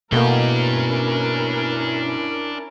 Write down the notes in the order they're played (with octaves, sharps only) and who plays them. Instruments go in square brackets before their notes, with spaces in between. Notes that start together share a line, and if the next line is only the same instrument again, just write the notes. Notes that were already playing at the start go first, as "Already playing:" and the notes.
[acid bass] B2 [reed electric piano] A3 A#3 [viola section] C#4 E4 A#4 [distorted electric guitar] D4 G5